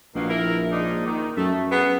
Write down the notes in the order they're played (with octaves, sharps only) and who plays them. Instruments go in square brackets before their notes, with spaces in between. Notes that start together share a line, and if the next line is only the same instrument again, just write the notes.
[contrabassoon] A#1 [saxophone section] B2 D#3 A#3
[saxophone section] E4 A#4
G#2 D4 D#4
D#3
[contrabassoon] F#2 [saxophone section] A3
[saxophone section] B3 G#4